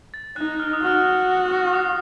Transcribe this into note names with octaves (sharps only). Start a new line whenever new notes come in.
A6
D#4 F#6
F6
D#6
F#4 F6
D#6